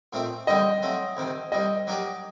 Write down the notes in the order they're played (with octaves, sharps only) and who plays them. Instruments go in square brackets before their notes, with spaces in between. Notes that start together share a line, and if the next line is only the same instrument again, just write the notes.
[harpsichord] A#2 A3 C4 D#4
[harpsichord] D#2 D3 G3 C4 [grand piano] D#5
[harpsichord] F#3 A3 C4
D2 C3 D#3
[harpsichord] C2 C3 G3 [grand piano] D#5
[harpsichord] F#3 A#3 D#4 G4 D5